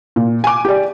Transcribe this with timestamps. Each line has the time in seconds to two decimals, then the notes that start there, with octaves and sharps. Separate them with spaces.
0.16 A#2
0.44 G#5 D6
0.65 G4 D5